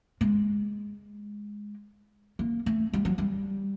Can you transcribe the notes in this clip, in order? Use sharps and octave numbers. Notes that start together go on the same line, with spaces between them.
G#3
A#3
A3
G3
F#3
G3